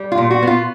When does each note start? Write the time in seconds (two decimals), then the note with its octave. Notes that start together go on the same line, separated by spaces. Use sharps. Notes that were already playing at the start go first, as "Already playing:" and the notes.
Already playing: G3
0.12 F4
0.18 A#2
0.31 F#4
0.42 B3 F4